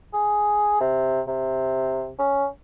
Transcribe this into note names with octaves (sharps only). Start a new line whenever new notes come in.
G#4
C3
C3
C#4